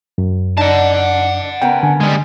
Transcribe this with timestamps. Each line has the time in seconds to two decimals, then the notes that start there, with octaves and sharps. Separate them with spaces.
0.18 F#2
0.57 D4 D#4 F#5 A5
1.62 C#3 B3 A#4 G5
1.83 D3 G#5
2.01 G3 G#3